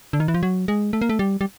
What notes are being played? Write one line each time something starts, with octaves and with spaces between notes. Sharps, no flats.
D3
D#3
E3
F3
F#3
G#3
A3
A#3
A3
G3
G3